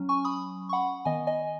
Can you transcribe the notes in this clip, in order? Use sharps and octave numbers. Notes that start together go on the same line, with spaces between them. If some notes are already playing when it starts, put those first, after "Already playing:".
Already playing: F#3 C#4
G#5 C#6
B5 D#6
C#6
F#5 B5
D#3 B3 D#5 G#5
D#5 G#5